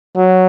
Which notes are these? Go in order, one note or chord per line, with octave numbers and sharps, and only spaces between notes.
F#3